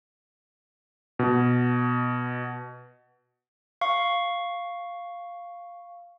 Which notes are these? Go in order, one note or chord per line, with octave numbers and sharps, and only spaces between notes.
B2
F5 C#6